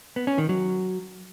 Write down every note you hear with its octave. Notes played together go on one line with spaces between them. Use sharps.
B3
C#4
D#3
F#3